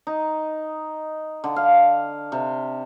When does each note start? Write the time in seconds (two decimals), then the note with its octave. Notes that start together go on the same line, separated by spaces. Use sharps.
0.07 D#4
1.44 D3
1.56 F5
2.32 C3